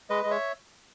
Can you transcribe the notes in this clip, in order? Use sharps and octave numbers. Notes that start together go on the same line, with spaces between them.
G#3 B4 D#5
G#3 D#5
C#5 E5